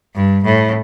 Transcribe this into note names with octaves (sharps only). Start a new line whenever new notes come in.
G2
A2